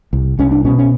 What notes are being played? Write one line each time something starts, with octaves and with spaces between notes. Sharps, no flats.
C2
C2 C#4
D4
B2 C#4
C#4